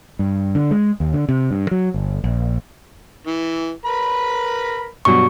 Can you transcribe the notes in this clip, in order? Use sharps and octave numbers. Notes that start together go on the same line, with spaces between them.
G2
D3
G#3
D#2
D3
C3
G2
F#3
G1
A#1
E3
A#4 B4 B5
G2 B2 F#3 C#6